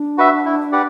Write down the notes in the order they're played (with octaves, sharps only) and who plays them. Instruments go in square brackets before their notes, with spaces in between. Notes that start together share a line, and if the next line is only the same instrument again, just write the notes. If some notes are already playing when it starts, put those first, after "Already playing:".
Already playing: [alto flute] D4
[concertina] F#4 B4 E5
E4
G4 B4 D5 F#5